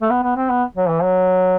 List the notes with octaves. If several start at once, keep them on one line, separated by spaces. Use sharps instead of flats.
A3
B3
B3
C4
B3
F#3
E3
F#3